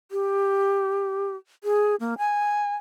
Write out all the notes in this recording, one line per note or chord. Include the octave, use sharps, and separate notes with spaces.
G4
G#4
A#3
G#5